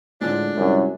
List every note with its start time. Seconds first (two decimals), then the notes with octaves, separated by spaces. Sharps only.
0.21 A2 D3 F3 G#3 D4
0.57 C2 F#2